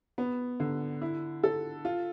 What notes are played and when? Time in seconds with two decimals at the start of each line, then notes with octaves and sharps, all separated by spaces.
0.18 B3
0.60 D3
1.01 E4
1.43 A4
1.85 F4